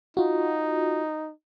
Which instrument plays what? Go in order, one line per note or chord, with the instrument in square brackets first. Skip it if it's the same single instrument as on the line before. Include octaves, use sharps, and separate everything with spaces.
[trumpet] D#4 [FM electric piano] F4 F#4